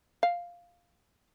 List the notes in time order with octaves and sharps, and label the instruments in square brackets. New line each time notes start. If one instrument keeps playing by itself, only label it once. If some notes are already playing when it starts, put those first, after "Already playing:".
[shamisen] F5